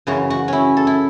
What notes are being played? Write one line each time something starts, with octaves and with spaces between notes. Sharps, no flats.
F#2 C#3 E3 F#4
F#4
C#4 E4
A4
E4